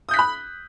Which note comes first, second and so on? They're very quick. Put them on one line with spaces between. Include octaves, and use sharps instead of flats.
D#6 G6 B6 F#6 B5